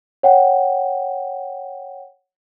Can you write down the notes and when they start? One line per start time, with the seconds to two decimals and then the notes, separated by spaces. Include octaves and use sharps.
0.23 C#5 F#5 G5